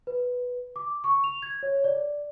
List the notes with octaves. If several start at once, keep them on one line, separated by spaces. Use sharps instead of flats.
B4
D6
C#6
F7
G#6
C#5
D5